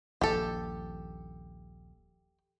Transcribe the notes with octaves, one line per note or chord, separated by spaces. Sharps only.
D#1 A#1 G4 A4